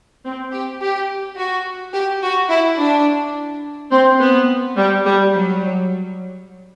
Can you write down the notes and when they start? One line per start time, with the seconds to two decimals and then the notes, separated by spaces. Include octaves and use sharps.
0.24 C4
0.52 G4
0.81 G4
1.37 F#4
1.94 G4
2.22 F#4
2.50 E4
2.78 D4
3.91 C4
4.19 B3
4.76 G3
5.04 G3
5.33 F#3